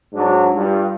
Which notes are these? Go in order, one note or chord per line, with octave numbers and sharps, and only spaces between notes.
G#2 F#3 D4
G2 F4